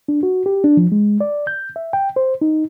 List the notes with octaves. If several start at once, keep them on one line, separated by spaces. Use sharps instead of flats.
D4
F#4
G4
D4
F3
G#3
D5
G6
E5
G5
C5
D#4